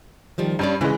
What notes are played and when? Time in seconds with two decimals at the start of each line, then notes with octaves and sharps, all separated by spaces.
0.38 D#3 F3 G3
0.59 G2 G3 C#4 D5
0.81 C#3 E3 G#3 C#4